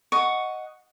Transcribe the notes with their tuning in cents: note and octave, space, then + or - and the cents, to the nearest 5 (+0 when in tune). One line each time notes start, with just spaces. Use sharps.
D#5 +0 F#5 +0 C#6 +10